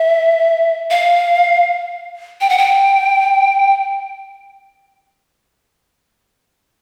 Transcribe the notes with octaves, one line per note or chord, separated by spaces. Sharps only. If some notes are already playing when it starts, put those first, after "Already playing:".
Already playing: E5
F5
G5
F#5
G5